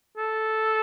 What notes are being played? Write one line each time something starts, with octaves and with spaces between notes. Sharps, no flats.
A4